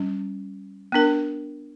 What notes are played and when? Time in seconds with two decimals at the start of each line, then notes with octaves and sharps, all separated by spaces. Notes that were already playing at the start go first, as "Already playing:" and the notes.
Already playing: G3 C#4
0.92 B3 D4 A#4